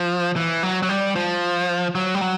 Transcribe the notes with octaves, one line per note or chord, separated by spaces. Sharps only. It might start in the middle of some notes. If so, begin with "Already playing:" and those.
Already playing: F3
E3
F#3
F#3
G3
F3
F#3
G3
F#3